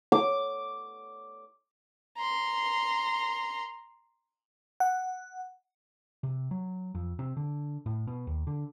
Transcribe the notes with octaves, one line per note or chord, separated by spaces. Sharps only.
D6
A#5 C6
F#5
C3
F#3
F2
C3
D3
A2
B2
D#2
D3